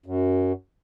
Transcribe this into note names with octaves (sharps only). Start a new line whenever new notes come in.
F#2